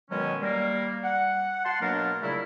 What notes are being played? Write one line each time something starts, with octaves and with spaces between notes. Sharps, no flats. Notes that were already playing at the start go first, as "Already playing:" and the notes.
B2 D#3 F#3 G#3 C#4
G3 A#3
F#5
F#5 A5 C6
B2 F#3 A#3 D4 A#4
A#2 C#3 G3 A3 E4